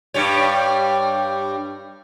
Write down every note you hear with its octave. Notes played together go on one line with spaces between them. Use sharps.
G2 G3 C#5